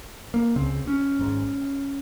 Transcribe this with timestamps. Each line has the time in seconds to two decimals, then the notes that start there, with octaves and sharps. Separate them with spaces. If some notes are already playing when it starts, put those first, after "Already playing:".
0.34 A#3
0.56 C#2 C#3 C4
0.87 C#4
1.19 G#1 G#2